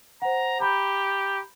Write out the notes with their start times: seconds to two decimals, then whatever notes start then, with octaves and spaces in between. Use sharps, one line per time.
0.22 C5 F#5 A#5
0.60 G4 A#5 B5 G6